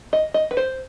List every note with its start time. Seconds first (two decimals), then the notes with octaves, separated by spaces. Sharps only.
0.13 D#5
0.34 D#5
0.51 B4
0.57 C5